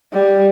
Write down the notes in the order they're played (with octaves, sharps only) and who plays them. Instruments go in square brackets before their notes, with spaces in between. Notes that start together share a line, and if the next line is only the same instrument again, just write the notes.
[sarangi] G3